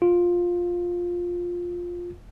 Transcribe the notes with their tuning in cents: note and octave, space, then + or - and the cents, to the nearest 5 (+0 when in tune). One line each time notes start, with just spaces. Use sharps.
F4 +10